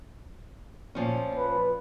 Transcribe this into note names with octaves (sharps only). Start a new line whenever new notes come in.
A#2 F3 C#4
B4